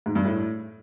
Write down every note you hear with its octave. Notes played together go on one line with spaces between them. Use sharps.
G#2
G2
A2